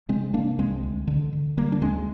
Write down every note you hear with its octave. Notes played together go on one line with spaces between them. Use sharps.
C3 G#3 C4
C3 A#3 D4
C2 G#3 C4
D2
D3
D3
D3 G3 A#3
D4
D2 G#3 C4